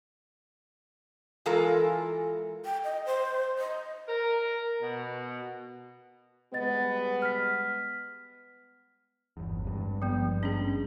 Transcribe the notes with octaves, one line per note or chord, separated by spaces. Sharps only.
E3 G#3 F4 A4 A#4
G5
D#5
C5
D#5
A#4
B2
G3 G#3 B3 D#5 A6
F6 B6
G1 E2
G#1 G2
F3 B3
C#4 D4 G#4